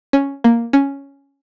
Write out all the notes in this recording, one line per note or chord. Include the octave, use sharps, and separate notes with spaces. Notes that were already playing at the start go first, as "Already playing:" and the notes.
C#4
A#3
C#4